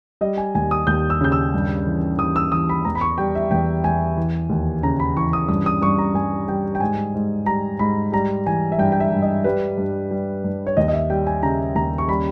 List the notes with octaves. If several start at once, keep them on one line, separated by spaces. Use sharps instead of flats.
G3 D#5
G#5
D#2 G#5
D#6
D#2 G6
E6
C#3 G6
E6
G2
E3
E3 D#6
E6
E3 D#6
B5
E2 A#5
B5
C#6
G3 G5
E5
E2 G5
E2 G#5
E3
D#2
C#3 A#5
B5
E3 C#6
D#6
G2 D#6
D#6
G2 C#6
A#5
G2 G#5
G3 G5
G5
G#2 G#5
G#2
G3 A#5
G#2 B5
G3 A#5
E3 G#5
E5
G2 G5
G5
E5
G2
D#5
G3 B4
G2
G3
G2
C#5
D#2 D#5
D#5
E5
G3 G5
G#5
C#3 A#5
D#2 A#5
C#6
G3 B5